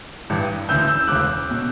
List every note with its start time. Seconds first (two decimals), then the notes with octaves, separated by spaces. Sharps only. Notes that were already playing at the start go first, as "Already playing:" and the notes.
0.30 A1 G2 E3
0.69 D2 C#3 E3 E6 G6
0.88 E6 G6
1.08 E1 D2 C#3 E3 D6 F#6
1.51 B2